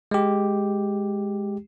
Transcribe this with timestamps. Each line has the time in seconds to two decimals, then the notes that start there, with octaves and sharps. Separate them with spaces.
0.11 G#3 G4